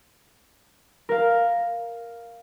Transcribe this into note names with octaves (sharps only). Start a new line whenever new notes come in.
A#4 F5